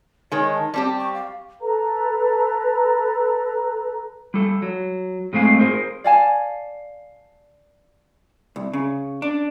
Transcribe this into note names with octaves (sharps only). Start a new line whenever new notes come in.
D#3 G#3 C#5
A5
G3 C4 G4
C#6
F5
A4 B4 A#5
G3 A4
F#3
A2 G#3 A3 C4 F5 G#5
G#4 A#4 C5
D5 F5 G#5 A5
C2
C#3
D4